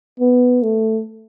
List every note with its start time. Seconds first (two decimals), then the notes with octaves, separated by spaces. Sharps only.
0.20 B3
0.63 A3